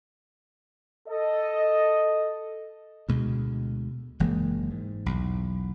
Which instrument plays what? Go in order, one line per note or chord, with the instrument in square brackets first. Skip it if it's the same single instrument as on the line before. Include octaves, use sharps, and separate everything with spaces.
[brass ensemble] A4 D#5
[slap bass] D2 B2 G#3
F#1 E3 G#3 A#3
G#2
B1 E2